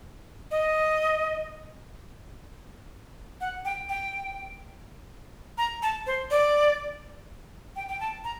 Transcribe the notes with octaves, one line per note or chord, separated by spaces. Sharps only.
D#5
F#5
G5
G5
A#5
A5
C5
D5
G5
G5
A5
A#5